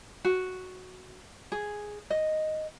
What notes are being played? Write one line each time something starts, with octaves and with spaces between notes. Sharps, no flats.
F#4
G#4
D#5